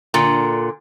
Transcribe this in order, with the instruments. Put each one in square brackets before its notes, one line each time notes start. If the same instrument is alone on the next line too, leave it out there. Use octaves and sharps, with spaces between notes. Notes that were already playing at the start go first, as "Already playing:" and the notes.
[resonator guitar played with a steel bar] A#2 D3